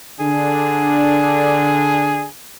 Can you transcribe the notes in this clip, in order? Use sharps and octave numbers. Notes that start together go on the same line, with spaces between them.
D3 D4 G#4